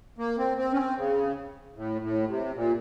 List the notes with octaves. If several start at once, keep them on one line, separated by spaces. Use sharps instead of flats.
A#3
C4
C4
C#4
C4
C#3
A2
A2
C3
A#2